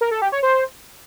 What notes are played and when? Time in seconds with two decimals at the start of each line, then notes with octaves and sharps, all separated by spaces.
0.01 A#4
0.11 A4
0.22 G4
0.32 C#5
0.43 C5